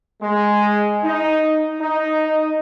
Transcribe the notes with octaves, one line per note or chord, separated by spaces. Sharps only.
G#3
D#4
D#4